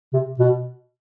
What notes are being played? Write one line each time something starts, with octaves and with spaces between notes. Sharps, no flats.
C3
B2